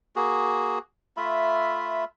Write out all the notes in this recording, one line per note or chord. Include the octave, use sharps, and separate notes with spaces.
A#3 F#4 G#4
A3 F4 E5 B5